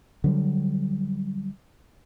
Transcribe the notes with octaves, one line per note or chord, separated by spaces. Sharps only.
D3 F#3 G3